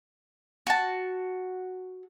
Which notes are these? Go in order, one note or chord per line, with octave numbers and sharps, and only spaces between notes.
F#4 A5